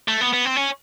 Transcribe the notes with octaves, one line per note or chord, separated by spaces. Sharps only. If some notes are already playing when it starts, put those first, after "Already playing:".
A3
B3
B3
C4
C#4